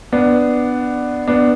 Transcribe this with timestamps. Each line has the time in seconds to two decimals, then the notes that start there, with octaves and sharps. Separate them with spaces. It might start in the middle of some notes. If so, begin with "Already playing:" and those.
0.13 B3 D4
1.28 B3 D4